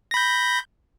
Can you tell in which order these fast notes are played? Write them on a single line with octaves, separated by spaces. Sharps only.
A#6 B5 G6